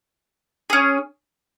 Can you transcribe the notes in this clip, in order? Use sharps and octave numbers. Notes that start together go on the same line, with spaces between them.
C#4 G#4